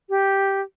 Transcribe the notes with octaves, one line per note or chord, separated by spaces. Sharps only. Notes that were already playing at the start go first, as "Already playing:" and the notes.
G4